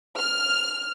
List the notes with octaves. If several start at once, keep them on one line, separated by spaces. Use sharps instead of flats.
F6